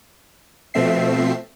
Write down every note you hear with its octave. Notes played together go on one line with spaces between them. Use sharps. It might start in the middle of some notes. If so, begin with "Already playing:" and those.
B2 F3 A3 C4 E5 C7